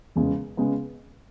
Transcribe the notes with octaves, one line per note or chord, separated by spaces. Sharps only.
E1 E2 C#3 G#3 B3
C#3 G#3 B3